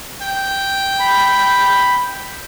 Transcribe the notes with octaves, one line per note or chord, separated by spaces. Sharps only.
G5
B5